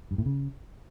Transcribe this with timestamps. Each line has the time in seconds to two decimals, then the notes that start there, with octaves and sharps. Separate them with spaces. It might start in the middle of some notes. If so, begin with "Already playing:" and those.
0.11 G2
0.18 A2
0.26 C#3